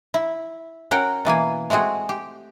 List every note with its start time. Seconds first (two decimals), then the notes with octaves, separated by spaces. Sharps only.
0.14 E4
0.91 C#4 F#4 A#4 F#5 G5
1.25 B2 E3 A#3 G#5
1.70 G#3 A3 C4 F#4 G#4
2.09 G4